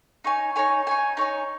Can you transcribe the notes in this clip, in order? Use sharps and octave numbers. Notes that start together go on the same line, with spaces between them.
D#4 C#5 G#5
D#4 C#5 G#5
D#4 C#5 G#5
D#4 C#5 G#5